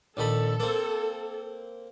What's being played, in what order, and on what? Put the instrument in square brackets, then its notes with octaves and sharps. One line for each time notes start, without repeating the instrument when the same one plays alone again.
[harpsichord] A#1 D#3 B5 [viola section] A4
[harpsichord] A#3 C4